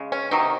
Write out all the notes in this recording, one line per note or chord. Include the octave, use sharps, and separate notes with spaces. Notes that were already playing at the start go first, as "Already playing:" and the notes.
Already playing: C#3 G#3
C#4
C3 D#3 F#3 A3 D#4